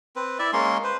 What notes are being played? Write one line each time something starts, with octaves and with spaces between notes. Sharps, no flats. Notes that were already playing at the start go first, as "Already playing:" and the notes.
C4 B4
E4 D5 E5
G#3 A#3 C#4 C6
B4 C5